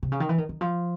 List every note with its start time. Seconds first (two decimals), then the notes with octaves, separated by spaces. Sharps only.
0.03 C3
0.12 C#3
0.20 D#3
0.29 E3
0.38 D#3
0.49 D#3
0.61 F3